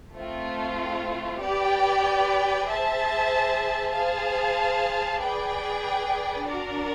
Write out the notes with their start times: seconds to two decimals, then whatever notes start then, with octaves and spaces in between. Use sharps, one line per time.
0.15 A3 C4 F4
1.42 G4 B4 D5 G5
2.67 G#4 C5 E5 A5
3.94 G#4 C5 F5 A5
5.19 G#4 B4 D5 G5
6.45 D4 F#4 A#4 D5